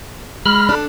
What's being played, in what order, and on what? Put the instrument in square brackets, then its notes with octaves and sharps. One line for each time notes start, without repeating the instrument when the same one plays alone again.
[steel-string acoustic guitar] G#3 [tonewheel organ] B5 F6
[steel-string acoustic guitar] D4 A4